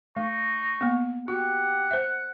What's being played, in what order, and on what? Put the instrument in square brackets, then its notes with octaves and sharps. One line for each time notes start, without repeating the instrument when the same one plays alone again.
[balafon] A3 [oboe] D#4 [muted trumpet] C#6
[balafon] A#3 B3
[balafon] F#4 [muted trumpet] G4 [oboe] F#5
[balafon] C5 E5